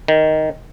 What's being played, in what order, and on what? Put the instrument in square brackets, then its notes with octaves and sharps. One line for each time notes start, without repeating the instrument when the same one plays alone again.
[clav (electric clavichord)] D#3